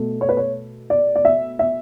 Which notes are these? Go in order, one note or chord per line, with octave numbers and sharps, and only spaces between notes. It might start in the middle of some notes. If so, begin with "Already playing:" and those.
Already playing: B2 A3
C#5
B4
C#5
D5
D5
E5
E5